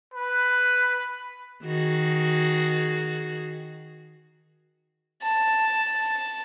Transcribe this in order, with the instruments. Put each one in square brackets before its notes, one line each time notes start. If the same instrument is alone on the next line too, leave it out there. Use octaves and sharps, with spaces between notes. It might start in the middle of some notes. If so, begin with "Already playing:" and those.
[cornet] B4
[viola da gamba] D#3 F#4 G#4
[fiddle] A5